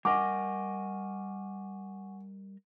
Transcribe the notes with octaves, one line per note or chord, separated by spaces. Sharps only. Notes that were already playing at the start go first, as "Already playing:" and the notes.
G3 A#4 D#5 F#5 G#5 C#6 D6